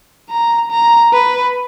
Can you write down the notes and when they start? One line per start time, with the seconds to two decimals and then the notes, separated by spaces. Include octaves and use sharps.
0.30 A#5
0.71 A#5
1.12 B4